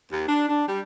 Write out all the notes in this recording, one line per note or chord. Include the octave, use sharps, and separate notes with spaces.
D#2
D4
D4
G3